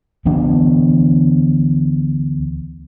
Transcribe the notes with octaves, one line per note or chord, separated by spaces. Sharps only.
D2 E3 B3 D4